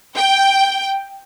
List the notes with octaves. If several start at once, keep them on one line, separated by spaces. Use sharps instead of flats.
G5